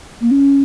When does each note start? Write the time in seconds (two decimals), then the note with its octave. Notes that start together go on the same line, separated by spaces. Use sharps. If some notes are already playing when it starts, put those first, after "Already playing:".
0.21 A#3
0.31 C#4